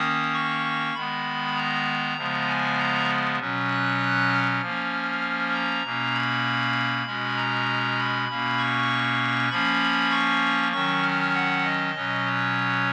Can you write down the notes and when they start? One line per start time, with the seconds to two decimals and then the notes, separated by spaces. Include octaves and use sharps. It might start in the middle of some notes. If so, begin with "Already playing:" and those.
Already playing: D#3 A#3 C#4 D#6
0.34 C#6
0.94 D#3 G#3 B3 B5
1.56 A#5
2.17 C#3 F3 G#3 B3
2.47 G#5
2.78 A#5
3.38 B2 F#3 C#4
3.70 F#6
4.30 F6
4.61 F3 A#3 C#4
5.53 A#5
5.83 B2 A#3 C#4
6.14 B5
7.06 B2 G#3 C#4
7.36 A#5
7.98 B5
8.29 B2 A#3 C#4
8.58 C#6
9.50 F3 A#3 C#4 B5
10.11 C#6
10.72 D#3 F#3 C#4 C#6
11.02 F6
11.34 F#5
11.65 D#5
11.95 B2 F#3 C#4
12.25 C#5